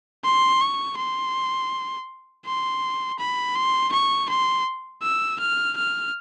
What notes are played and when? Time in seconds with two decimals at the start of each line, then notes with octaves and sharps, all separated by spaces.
0.24 C6
0.61 C#6
0.98 C6
2.45 C6
3.19 B5
3.55 C6
3.92 C#6
4.29 C6
5.03 E6
5.40 F6
5.77 F6